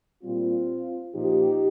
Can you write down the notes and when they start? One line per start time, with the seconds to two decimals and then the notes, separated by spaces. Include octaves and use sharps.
0.23 A#2 G3 C4 F4
1.15 A#2 F3 D#4 G4